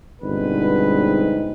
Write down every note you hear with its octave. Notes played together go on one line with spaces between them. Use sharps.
G1 B2 G#3 C4 D#4 B4